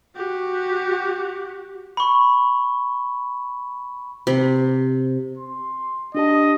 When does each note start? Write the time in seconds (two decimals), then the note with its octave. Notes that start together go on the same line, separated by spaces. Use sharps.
0.16 F#4 G4
1.97 B5 C#6
4.27 C3
5.38 C6
6.15 D4 G4 D#5 A5